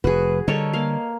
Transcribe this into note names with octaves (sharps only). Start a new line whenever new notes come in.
F1 F#4 G#4 B4
D3 G3 A4 A#4 C#5 D#5
A#3 F5